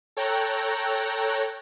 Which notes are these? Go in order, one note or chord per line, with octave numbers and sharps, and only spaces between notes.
A4 C#5 G5 A#5 F#6 A#6